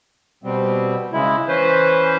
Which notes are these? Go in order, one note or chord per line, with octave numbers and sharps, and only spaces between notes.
B2 G3 C4
C#3 G#3 E4
E3 C#4 B4 C5